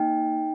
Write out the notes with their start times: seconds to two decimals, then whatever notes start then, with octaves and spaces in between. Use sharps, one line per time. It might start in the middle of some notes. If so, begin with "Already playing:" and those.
Already playing: A#3 D#4 G5